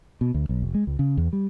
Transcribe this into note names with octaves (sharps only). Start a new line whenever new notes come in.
B2
D2
B1
F1
G#3
C#2
C#3
E2
G3